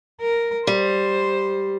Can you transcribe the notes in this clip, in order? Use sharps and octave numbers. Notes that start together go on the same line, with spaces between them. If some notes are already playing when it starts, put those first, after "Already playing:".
A#4
G3 C5